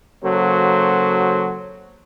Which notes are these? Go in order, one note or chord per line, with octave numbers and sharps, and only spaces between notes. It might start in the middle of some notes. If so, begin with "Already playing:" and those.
C#3 F#3 A#3 F#4 A4 C5